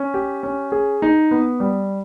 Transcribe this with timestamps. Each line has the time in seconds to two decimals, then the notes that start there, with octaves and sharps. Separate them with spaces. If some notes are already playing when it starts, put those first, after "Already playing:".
Already playing: C#4
0.14 G4
0.43 C#4
0.72 G#4
1.02 D#4
1.31 B3
1.60 G3